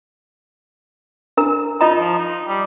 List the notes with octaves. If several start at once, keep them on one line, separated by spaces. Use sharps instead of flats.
D4 A#4 A#5
D#4 F4 D#5 A#5
F3
D#4
G3